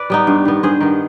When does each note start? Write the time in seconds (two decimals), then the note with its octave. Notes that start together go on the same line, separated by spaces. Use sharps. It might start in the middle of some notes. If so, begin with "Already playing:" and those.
Already playing: B4 D5
0.10 G3 B3 D#4
0.27 G2
0.45 D#3 B3
0.63 G2 G#4 C5
0.81 D#3 B3